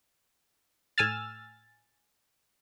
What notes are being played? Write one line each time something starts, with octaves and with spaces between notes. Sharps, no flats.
A2 G#5 E6 F6 A6